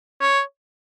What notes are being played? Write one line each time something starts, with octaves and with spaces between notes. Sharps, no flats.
C#5